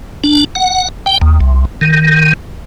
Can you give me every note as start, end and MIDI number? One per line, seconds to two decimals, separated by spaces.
0.24 0.44 62
0.55 0.89 78
1.06 1.18 79
1.21 1.39 39
1.40 1.65 36
1.81 2.33 51